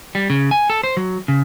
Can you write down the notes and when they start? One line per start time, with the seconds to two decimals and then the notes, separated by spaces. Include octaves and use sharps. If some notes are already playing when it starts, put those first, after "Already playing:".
0.15 G3
0.30 C#3
0.51 G#5
0.70 A4
0.83 C5
0.97 F#3
1.28 C#3